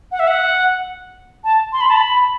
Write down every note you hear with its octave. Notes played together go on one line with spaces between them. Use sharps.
F#5
E5
F#5
A5
C6
B5
A5
B5